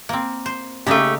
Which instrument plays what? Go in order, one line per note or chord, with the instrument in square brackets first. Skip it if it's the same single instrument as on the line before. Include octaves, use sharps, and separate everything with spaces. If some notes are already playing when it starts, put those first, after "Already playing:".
[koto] A#3 C4
C5
[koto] C#3 A#3 D#4 [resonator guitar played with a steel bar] A3 G4